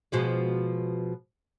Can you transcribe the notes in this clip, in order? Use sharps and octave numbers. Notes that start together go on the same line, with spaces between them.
B2 F3 G#3